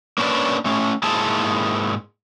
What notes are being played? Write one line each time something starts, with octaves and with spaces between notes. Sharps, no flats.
A#3 C#4 D4 B4 D5
A3 C#4
G#2 A#3 E4 G#4 C5 A5